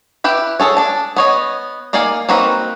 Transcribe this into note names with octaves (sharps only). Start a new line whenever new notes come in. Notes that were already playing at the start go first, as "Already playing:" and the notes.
E4 G4 B4
G#4 A4 C#5
D4 A5
B3 C#5 D#5
A#3 D#4 D5 F5 G#5
A#3 C4 D#4 F#4 B4